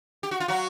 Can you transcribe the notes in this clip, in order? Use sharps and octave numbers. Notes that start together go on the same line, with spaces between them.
G4
F#4
F4
F#3 F#4